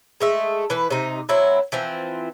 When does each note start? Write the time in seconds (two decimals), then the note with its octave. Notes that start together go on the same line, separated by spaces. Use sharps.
0.20 G#3 A3 E5
0.70 E3 B4
0.91 C3 D#4
1.29 F#3 C4 E4
1.72 E3 F3 C4